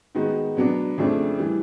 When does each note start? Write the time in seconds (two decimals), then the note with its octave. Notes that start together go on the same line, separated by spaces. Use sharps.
0.15 D#3 G#3 B3 D#4 F#4
0.57 B2 F#3 B3 D4
0.98 F2 C#3 F3 A3 D4
1.39 E3 G3